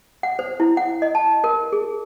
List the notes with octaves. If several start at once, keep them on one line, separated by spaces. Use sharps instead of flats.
F#5
C5
E4
F#5
D#5
A5
A#4
G#4